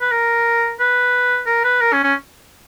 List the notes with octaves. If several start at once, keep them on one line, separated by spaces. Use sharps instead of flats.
B4
A#4
B4
A#4
B4
A#4
C#4
C#4